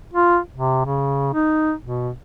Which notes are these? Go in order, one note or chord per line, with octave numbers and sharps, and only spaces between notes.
F4
C3
C#3
D#4
B2